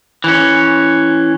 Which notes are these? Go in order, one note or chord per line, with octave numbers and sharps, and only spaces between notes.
E3 C#4